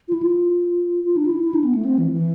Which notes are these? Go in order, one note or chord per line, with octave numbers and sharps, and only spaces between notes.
F4
E4
F4
F4
D4
F4
E4
E4
D4
B3
A3
C4
E3
E3